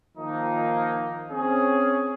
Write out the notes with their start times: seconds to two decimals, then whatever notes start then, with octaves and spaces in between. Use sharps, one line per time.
0.17 D#3 F3 A#3 D#4
1.30 C4 C#4 G#4